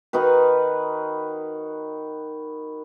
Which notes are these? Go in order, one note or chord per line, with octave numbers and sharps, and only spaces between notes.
D#3 D#4 F#4 B4